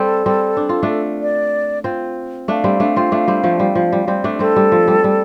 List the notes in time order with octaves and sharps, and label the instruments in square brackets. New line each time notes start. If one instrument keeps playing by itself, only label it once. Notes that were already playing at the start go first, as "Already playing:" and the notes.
Already playing: [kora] G3 C4 [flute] A4
[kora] G3 C4
D4
F4
A3 D4
[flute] D5
[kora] C4 F4
[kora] A3 D4 [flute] F5
[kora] G3 C4
A3 D4
C4 F4
A3 D4
G3 C4
F3 A3
G3
F3
G3
G3 C4
A3 D4
[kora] G3 C4 [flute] A4
[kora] G3
F3
G3
G3